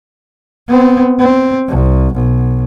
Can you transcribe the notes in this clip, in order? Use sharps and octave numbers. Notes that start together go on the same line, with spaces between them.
B3 C4
C4
C2
B1